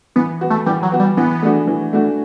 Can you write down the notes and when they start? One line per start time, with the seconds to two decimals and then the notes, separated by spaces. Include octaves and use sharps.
0.16 E3 B3
0.41 B3 F#4
0.50 A3
0.66 E3 G3
0.83 F#3
0.92 B3 F#4
1.00 G3
1.17 E3 B3
1.42 A3 D4 F#4
1.67 E3
1.93 A3 D4 F#4